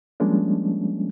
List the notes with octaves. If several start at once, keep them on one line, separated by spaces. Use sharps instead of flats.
F3 G3 G#3 A#3 C#4 D4